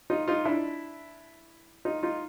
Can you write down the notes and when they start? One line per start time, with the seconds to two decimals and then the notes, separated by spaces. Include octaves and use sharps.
0.10 D#4 F4
0.28 D#4 F4
0.45 D4 E4
1.85 D#4 F4
2.03 D#4 F4